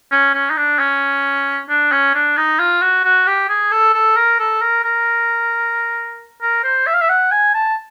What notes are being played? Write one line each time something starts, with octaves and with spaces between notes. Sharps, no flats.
C#4
C#4
D#4
D4
C#4
D4
C#4
D4
D#4
F4
F#4
F#4
G4
G#4
A4
A4
A#4
A4
A#4
A#4
A#4
C5
E5
F5
E5
F#5
G#5
A5